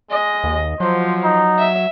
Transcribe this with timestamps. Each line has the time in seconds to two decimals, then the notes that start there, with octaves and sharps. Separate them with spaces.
0.11 G#3 D#5
0.44 D#2
0.80 F3 F#3 C5
1.24 D#4
1.59 E5